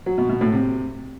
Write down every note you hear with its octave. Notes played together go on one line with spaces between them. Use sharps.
F#3
B2
B2
A2
C3